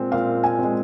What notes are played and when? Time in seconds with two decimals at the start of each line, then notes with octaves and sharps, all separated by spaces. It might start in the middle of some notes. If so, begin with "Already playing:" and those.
Already playing: A#2 G#3 C4
0.12 A#2 F5
0.44 G#5
0.59 G#3 C4